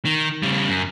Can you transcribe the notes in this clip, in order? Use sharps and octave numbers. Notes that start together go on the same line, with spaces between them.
D#3
C#3 G3
F#2